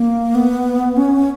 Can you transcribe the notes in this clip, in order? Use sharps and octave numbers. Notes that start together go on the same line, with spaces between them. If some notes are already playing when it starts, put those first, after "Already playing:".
Already playing: A#3
B3
C#4